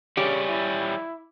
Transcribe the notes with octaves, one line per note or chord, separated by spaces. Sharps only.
C#3 G3 C#4 G4
E4